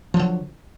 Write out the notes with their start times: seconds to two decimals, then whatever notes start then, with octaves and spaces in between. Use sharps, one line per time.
0.14 F3
0.17 F#3
0.19 D3